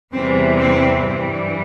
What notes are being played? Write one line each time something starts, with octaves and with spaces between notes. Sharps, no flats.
E2 C3 E3 G3 C4
C4
G2 E3 G3